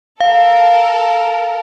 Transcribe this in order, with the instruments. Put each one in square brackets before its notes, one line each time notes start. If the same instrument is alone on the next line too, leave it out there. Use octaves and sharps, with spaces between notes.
[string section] A4 A#4 [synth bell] F5